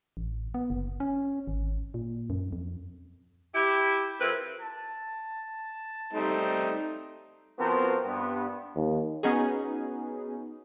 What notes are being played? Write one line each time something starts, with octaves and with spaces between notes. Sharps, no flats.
A1
B3
F#1
C#4
G#1
A#2
F#2
F2
E4 G4
F2 C4 E4 A#4 B4
A5
G3 A3 C4 D#4
F3 B3 C4 F#4 A#4 C5
G2 B3
D#2
B3 C#4 D#4 F#4 G#4